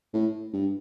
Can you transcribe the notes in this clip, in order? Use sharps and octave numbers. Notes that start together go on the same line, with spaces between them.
A2
G2